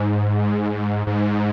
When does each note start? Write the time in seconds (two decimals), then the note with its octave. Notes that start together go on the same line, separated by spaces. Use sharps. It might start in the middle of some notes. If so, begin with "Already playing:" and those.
Already playing: G#2
1.07 G#2